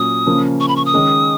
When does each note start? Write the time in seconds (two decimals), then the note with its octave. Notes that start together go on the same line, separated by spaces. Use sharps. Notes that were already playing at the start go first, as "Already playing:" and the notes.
Already playing: A#2 F#3 C#4 D#6
0.27 C#3 F3 A#3 C#4
0.60 C#6
0.68 B5
0.76 C#6
0.86 D#6
0.94 D#3 G#3 C#4